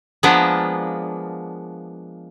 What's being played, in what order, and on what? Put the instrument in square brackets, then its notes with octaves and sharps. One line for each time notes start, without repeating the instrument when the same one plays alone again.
[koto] F3 G#3 A#3 B3 D4